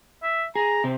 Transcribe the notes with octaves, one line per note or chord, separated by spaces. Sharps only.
E5
G#4 A#5
C3 C4